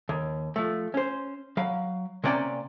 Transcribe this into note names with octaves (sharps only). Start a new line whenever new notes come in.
D#2
F3 A3
C#4 C5
F#3 F5 B5
C3 A#3 C#4 D5 G5